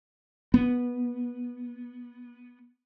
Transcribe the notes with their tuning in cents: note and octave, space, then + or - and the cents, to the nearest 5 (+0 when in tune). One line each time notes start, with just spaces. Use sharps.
B3 -10